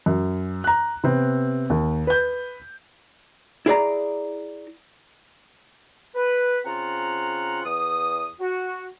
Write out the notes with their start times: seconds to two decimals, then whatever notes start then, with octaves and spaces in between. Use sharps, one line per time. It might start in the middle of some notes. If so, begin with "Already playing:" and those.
0.06 F#2
0.64 A#5 F#6
1.04 C3 B3 C4
1.70 D#2
2.07 B4 G6
3.66 E4 G#4 D5 A#5
6.14 B4
6.65 C#3 C4 F4 F#5 A#5
7.65 E2 D#6
8.39 F#4